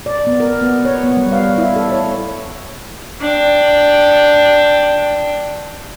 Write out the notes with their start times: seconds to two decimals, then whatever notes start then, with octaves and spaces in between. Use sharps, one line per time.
0.06 D5
0.27 B3
0.40 A#4
0.62 B3
0.85 C#5
1.03 B3
1.17 G3
1.32 F5
1.58 E4
1.76 A4
1.92 C#5
3.21 D4 G5